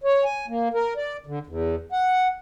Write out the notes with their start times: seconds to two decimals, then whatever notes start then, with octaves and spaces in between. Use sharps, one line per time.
0.04 C#5
0.24 G#5
0.48 A#3
0.74 A#4
0.97 D5
1.27 D3
1.47 E2
1.92 F#5